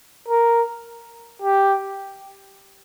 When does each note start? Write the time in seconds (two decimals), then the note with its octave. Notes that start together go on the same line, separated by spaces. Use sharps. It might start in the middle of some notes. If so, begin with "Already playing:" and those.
0.28 A#4
1.42 G4